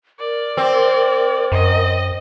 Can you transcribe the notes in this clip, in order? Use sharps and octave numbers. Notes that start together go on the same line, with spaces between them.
A#4 D5
C4
F#2 D#5